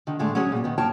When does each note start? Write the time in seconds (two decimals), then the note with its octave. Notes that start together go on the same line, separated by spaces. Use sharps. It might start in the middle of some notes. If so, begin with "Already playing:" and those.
0.07 D3 D#3
0.19 A2 D3 G#3 A3
0.35 F#3 C#4 G#4 C#5
0.52 A#2 B3
0.64 D#3 B3
0.78 F#2 A#3 A#4 C#5 G5 A5